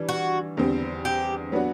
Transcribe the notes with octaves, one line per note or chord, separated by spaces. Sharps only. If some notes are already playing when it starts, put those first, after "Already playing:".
Already playing: E3 G3 D4
F#4
E2 D3 G3 C4
G4
F#3 B3 D4 F#4